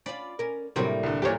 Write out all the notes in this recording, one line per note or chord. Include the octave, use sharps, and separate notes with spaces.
C#4 F4 D5 B5
C#4 A#4
A2 C3 F#3 G3 A#3 C4 D4 A#4
C2 D3
E2 A#2 G4 C5 C#5